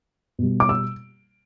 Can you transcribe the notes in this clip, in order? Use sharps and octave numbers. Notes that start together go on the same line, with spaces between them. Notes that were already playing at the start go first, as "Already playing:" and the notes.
B2 G3
D6
E6